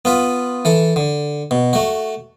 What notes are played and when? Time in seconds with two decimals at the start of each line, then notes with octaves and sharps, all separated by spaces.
0.05 B3 F4 B4
0.65 E3 A4
0.96 D3
1.51 B2
1.73 A3 F#4